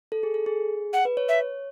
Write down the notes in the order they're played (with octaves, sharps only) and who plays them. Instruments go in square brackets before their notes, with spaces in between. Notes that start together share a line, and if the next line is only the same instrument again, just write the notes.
[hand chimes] A4
G#4
A4
G#4
[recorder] F#5
[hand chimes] B4
C#5
[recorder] E5